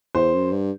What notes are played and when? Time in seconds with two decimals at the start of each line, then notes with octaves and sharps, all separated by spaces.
0.15 E2 C5
0.34 F#2
0.52 G2